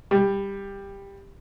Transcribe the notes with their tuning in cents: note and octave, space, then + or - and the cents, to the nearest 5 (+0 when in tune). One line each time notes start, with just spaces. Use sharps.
G3 +10